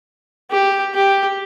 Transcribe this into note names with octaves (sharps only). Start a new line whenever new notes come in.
G4
G4